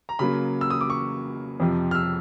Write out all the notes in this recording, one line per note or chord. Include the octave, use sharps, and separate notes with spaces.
A#5
C#3 F#3 A#3 B5
E6
D#6
D6
C#6
F2 C3 F3
F6
E6